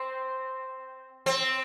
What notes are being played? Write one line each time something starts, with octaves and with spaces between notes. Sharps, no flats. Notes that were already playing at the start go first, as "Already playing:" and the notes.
Already playing: C4
C4